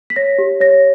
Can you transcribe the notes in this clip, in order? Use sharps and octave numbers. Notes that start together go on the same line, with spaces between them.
B6
C#5 A#6
G4
C#5 A#6